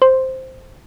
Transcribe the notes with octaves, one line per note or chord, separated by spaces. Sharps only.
C5